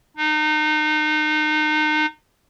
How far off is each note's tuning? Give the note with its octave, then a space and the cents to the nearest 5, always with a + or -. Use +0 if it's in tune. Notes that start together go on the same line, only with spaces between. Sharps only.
D#4 -30